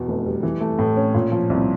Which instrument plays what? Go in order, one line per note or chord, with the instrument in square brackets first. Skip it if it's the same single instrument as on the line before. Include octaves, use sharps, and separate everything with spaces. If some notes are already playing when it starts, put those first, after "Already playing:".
Already playing: [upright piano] E2 B2
F1
G3
E3
A3
A2
C#4
A#2
F3
C2